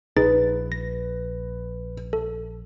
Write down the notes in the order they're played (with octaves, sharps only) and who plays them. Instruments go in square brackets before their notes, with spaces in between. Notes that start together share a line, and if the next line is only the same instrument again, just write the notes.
[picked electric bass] A#1 [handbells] D#4 G#4 A6 [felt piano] B4
[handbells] A#6
A4